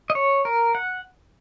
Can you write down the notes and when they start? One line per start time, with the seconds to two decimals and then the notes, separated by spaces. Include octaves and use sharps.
0.10 D#5
0.15 C#5
0.45 A#4
0.75 F#5